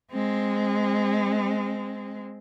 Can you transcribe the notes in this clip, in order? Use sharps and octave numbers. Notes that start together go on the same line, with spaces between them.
G#3 C4